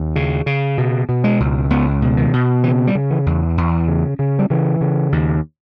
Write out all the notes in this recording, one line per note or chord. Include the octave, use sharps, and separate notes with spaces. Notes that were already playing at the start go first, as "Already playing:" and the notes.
Already playing: D#2
C#3
C#3
B2
B2
G#3
C#2
C#2 B3
B2
D#3
B2
C#3 E3
G3
C#3
E3
E2
E2
C#3
C#3
G3
C#3 E3
C#3
D#2